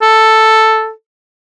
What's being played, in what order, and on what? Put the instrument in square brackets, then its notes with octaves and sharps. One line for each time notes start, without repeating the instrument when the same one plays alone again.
[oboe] A4